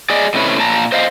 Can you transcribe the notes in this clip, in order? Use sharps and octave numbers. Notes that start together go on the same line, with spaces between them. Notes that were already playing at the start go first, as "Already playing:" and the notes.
G#4 D5 D#5
A2 C3 C#4 B4 C#5
A#2 A5 A#5
C5 D#5 F5